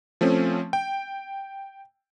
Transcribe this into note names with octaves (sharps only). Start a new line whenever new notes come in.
F3 A3 C4 C#4
G5